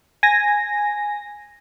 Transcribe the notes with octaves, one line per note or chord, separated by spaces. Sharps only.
G#5 A#6